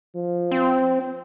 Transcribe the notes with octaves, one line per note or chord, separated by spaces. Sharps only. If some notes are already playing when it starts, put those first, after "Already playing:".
F3
C4